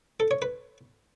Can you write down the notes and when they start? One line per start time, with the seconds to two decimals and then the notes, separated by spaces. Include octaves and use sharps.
0.20 A4
0.31 C#5
0.42 B4